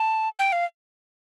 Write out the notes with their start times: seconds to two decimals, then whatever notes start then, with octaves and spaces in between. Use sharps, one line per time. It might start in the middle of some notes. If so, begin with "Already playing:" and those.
Already playing: A5
0.39 G5
0.52 F5